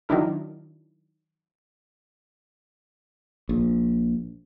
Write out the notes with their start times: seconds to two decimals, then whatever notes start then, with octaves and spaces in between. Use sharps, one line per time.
0.09 D#3 F#3 D4 E4 A#4
3.49 A#1